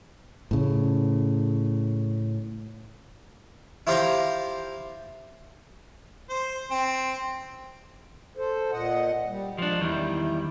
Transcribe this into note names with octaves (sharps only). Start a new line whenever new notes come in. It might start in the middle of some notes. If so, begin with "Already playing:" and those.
A2 C#3
E4 F4 G4 C5 F5 A#5
C5
C4
A4 C5
A#2 D#5 F#5
G3
F3 G#3 D4
E2 D#3 G3 E4